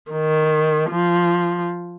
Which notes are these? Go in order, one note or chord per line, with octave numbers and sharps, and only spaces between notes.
D#3
F3